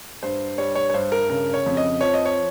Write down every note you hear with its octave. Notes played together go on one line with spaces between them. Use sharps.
G2 C5
G3 C#5
C#5
C#5
G2 C5
A#4
C#3 A#4
C#5
F2
D#5
F3 C#5
D#5
C#5